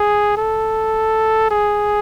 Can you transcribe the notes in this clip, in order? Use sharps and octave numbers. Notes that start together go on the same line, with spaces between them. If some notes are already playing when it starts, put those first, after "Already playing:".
Already playing: G#4
A4
G#4